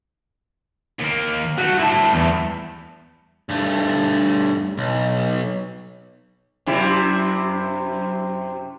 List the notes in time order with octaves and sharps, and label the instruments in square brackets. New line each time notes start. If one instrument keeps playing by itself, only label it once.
[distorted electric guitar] D#2 A#3
[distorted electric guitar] G2 A3 [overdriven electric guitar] F#4
[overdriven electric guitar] E4 A5
E2
[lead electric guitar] G2 A3
B1
[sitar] F#2 C3 E4